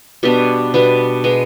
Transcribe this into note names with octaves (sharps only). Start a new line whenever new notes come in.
B2 G3 B3 D4
B2 G3 B3 D4
B2 G#3 B3